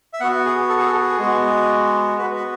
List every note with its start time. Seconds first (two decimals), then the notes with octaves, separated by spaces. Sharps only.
0.13 E5
0.20 B3 F#4 F#5
0.45 G#4
0.69 A4
0.79 G#4
0.86 A4
1.02 G#4
1.19 G#3 B3 F#4
2.18 F#4 B4
2.22 B3
2.36 B4